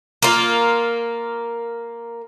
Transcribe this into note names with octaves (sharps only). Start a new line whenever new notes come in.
A#3 F4